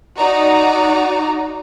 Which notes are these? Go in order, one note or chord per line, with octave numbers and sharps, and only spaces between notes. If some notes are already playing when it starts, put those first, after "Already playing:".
D#4 F#4 D5 A#5